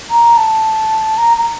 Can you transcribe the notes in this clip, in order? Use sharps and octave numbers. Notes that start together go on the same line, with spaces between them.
A#5
A5
A#5
A#5